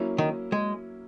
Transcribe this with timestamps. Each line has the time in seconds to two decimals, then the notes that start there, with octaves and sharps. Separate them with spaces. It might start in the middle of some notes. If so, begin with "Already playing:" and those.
Already playing: F#3 A#3 C#4 E4
0.18 D#3
0.52 G#3